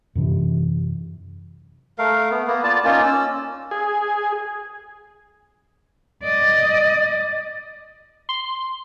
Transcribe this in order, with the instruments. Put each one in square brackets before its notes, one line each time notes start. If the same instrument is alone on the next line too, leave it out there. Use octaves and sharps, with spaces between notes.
[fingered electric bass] F#2 C3 E3
[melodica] A3 A#4 F5
B3
A#3 B3
F4 D5 A5
A#3 C#4 D#4 F4
C#4 E6
[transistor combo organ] G#4
[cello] D5 D#5
[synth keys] C6